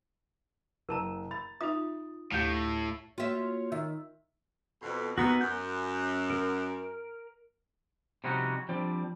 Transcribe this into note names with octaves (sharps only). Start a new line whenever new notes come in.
F#1 A#4 A5 A#5
B5 A6
D#4 F4 E5 D#6
D2 A2 G4 F5 G6
A#3 F4 F#4 C#5 E5
D#3 E5
F2 B2
D#2 G#2 B3 D#4 F#4
F#2 G6
A#4
C3 F3 G3 C#4 D#4 F#4
F3 G3 C4 D4